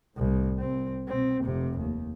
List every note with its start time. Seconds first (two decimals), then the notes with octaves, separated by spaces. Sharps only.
0.15 C2 A2
0.59 C2 C4
1.08 B2 C4
1.43 F1 C3
1.78 D#2